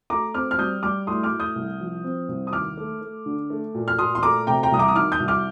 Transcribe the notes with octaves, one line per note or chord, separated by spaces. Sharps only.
A3 A#5 D6
C4 D6 F6
F6
G3 D#6 G6
G3 D6 F6
A2 C6 D#6
D6 F6
A2
D#6 G6
C2
F3
C4
C2
D#6
D#2 D6 F6
A3
A3
D3
A3
A#2
F6
A#2 C6 D#6
C6
A3 A#5 D6
C3 G5 A#5
G5 A#5
C2 D#6
A#5 D6
D#6
D#3 D6 F6
D#6 G6
C2
D6 F6